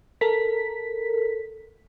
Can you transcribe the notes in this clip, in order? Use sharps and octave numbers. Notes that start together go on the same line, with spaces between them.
A4 A#4 B6